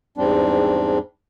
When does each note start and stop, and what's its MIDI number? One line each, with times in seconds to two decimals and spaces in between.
0.17 0.98 40
0.17 0.98 44
0.17 0.98 55
0.17 0.98 60
0.17 0.98 62